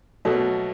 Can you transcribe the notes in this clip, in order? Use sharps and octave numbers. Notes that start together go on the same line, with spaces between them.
B2 F#3 A3